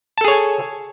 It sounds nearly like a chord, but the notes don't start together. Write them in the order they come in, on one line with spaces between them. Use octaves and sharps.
A5 A4 G#4 C#5 G#5